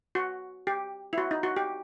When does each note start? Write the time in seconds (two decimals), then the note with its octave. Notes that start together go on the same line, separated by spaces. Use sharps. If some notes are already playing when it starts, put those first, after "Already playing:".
0.15 F#4
0.67 G4
1.13 E4
1.18 F#4
1.31 D#4
1.43 F#4
1.56 G4